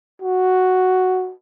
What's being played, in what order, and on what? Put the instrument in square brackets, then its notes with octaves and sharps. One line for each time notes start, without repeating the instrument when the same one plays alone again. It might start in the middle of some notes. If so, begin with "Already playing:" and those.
[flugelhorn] F#4